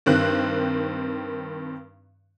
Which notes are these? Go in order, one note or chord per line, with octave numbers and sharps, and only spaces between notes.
G2 D#3 C4 F#6